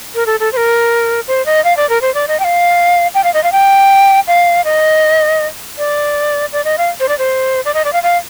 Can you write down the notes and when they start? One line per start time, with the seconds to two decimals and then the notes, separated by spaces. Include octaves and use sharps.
0.15 A#4
0.26 A4
0.40 A4
0.53 C5
0.57 A#4
1.28 C5
1.46 D#5
1.65 F5
1.77 D5
1.90 A#4
2.02 C5
2.14 D5
2.28 D#5
2.40 G5
2.44 F5
3.15 G5
3.24 F5
3.34 D#5
3.44 F5
3.52 G5
4.28 F5
4.65 D#5
5.78 D5
6.53 D5
6.65 D#5
6.78 F5
7.00 C5
7.09 D5
7.19 C5
7.65 D5
7.74 D#5
7.85 D5
7.93 F5
8.03 F5